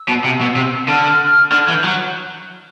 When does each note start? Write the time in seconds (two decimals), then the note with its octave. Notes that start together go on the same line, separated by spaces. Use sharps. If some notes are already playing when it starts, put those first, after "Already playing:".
Already playing: E6
0.09 B2
0.25 C3
0.41 B2
0.56 C3
0.88 D3 F6
1.52 D3
1.65 E3 G#6
1.75 G6
1.84 F#3 F#6